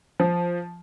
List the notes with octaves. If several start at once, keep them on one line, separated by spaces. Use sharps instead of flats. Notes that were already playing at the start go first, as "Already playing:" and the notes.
F3